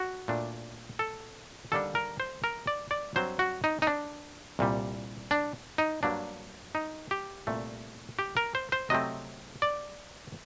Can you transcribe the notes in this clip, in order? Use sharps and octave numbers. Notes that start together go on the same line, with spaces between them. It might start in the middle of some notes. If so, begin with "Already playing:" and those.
Already playing: F#4
A#2 A3 D4
A4
D#2 D3 G3 A#3 D4 A4
A#4
C5
A#4
D5
D5
G2 F#3 C4 C5
F#4
D#4
D#4
D4
C2 A#2 G3
D4
D#4
G2 F#3 A#3 D4
D#4
G4
C2 A#2 A3
G4
A#4
C5
C5
C3 F#3 A3 C4 D#5
D5